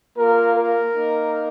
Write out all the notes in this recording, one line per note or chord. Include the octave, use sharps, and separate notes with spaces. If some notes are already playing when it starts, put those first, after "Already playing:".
A#3 F4 A#4
A#4
A#3 D#4